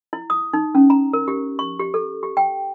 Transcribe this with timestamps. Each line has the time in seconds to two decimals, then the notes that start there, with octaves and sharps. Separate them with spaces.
0.13 E4
0.30 D#6
0.53 D#4
0.75 C#4
0.90 A#5
1.13 A#4
1.28 G4
1.59 C#6
1.80 G4
1.94 A4
2.23 G4
2.37 G5